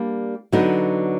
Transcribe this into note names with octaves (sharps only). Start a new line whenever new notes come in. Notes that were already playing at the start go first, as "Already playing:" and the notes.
Already playing: G3 A#3 D4
D3 F#3 B3 D#4